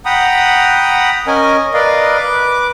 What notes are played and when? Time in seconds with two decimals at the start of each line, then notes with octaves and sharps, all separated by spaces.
0.05 F#5 G5 A#5 B5 D#6
1.27 C#4 A#4 D#5 G#5
1.74 A#4 B4 D5 D#5 F5
2.18 B4 D6